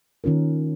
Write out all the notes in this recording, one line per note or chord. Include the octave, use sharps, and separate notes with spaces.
D#3 A#3 C#4 F4 A#4